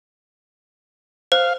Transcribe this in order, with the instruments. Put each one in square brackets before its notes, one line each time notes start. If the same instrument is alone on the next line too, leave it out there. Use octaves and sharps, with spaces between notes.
[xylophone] C5 [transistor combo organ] F5